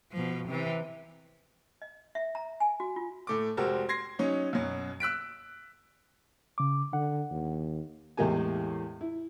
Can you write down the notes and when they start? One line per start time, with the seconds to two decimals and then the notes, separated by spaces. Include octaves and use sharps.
0.12 B2 F3
0.48 C3 E3
1.82 D#5
2.15 E5
2.35 A#5
2.60 G#5
2.80 F#4
2.96 F4
3.27 A2 A3 D6
3.57 F1 G#3 C4 F#4 G4 A#4
3.89 C6 G#6 A#6 C7
4.19 F#3 C#4 D#4
4.53 F#2 B2 F#3
5.00 E6 F#6 B6 D7
6.58 C#3 D6
6.93 D3 F#5
7.31 D#2
8.17 E2 A2 G#3 A#3 G4 G#5
9.01 E4